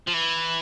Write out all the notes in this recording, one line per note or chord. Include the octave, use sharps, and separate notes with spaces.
F3
E3